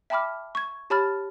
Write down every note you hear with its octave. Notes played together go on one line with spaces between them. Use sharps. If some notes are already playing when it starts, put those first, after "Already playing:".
E5 G5 A5 B5 D6 F6
C#6 G#6
G4 C#5 A5 B5 F6 A6